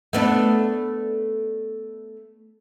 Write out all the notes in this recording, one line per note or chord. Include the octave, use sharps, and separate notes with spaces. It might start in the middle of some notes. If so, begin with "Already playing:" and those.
A3 B3 D4